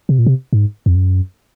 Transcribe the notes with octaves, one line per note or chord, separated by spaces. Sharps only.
C3
A#2
C3
G#2
F2
F#2